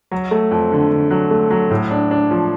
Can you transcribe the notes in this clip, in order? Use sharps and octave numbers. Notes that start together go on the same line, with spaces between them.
F#3
A3
F2
D3
D3
F#3
A3
F#3
A2
D4
D4
F3